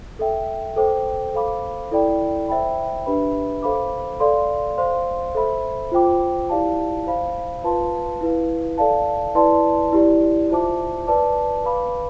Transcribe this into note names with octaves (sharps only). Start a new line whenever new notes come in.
A4 E5 G5
A4 C5 G5 D6
A4 C5 F5 B5 D6
E4 A4 D5 G5 B5
C5 E5 G5 B5
D4 G4 B4 E5 B5
A4 C5 F5 B5 D6
A4 D5 F5 C6
C5 F5 C6
A4 C5 E5 B5
F4 C5 G5 D6
E4 G4 D5 F5 A5
C5 F5 B5
F4 B4 F5 A5 C6
E4 B4 F5
A4 D5 F5 A5
E4 B4 D5 A5 C6
E4 G4 D5
F4 C5 E5 A5 D6
B4 D5 A5 D6
B4 F5 B5 D6